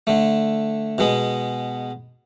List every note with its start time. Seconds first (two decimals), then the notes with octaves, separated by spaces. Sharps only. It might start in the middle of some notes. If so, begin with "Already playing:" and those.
0.07 D3 A3
0.98 B2 G#3 B3